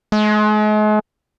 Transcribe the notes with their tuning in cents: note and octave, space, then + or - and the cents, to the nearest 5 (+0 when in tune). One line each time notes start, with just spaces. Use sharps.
G#3 +40